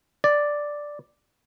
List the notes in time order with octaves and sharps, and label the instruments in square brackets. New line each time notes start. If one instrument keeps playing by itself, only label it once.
[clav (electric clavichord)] D5